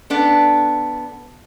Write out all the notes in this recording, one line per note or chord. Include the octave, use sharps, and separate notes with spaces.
B3 D4 A4